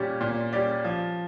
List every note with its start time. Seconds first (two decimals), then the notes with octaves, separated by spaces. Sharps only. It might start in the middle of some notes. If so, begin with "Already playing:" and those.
Already playing: A#2 G3 C#4 G4 D5
0.21 A#2
0.53 G3 C#4 G4 D5
0.84 F3